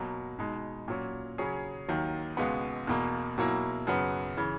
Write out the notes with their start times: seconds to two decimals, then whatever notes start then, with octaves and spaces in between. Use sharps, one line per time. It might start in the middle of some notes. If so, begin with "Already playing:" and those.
Already playing: B2 F#3 A#3
0.39 B2 G#3 D#4
0.88 A#2 F#3 C#4
1.38 C#3 F#3 C#4 G#4
1.88 D#2 D#3 F#3
2.37 C#2 B2 G#3 B3
2.87 E2 B2 A#3
3.38 B2 F#3 A#3 E4
3.87 F#2 C#3 F#3 B3
4.37 C#3 E3